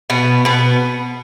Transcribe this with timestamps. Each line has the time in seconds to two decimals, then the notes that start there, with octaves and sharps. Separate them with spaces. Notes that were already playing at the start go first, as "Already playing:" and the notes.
0.10 B2 B3
0.45 B2 B3